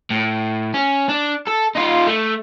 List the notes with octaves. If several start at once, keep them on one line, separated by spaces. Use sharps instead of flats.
A2
C#4
D4
A4
D#4 F4
A3